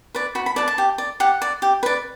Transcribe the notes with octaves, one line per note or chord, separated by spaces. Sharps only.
B4 D5
F#4 B5
B5
B4 D5 A5
A5
G4
D5
G4 F#5
D5
G4
B4 D5